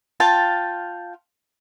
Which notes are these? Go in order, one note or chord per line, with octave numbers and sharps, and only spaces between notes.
F4 F5 G5 A5